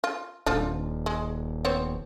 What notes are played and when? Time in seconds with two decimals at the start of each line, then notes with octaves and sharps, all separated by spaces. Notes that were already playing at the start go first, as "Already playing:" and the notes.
0.04 F4
0.46 D#1 D3 F3 F4
1.06 G#3
1.65 B3 C4 C#5